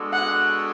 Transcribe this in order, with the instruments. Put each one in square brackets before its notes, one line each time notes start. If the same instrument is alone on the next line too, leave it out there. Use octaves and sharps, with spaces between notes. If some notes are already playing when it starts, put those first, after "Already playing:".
Already playing: [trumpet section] G#3 B3 D4 F#4 A4
[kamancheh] F#5